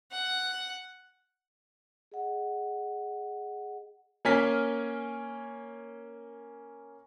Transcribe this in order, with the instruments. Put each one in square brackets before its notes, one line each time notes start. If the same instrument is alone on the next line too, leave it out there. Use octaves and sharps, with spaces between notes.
[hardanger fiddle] F#5
[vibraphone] G#4 D#5 F#5
[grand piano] A#3 C#4 G#5 F6 B6